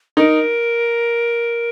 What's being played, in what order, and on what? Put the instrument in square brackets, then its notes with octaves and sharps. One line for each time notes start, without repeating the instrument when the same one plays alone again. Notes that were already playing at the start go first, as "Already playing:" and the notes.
[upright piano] D#4 [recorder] A#4